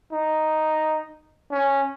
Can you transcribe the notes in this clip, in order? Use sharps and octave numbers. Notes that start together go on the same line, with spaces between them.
D#4
C#4